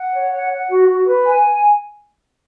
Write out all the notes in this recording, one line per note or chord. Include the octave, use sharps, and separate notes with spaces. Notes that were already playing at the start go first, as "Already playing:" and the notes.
Already playing: F#5
C#5
F#5
F#5
F#4
F#4
B4
G#5